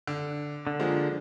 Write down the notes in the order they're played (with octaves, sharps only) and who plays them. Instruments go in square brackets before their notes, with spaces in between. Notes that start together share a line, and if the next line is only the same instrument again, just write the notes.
[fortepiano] D3
[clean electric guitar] D3
[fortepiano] F3 G#3 A#3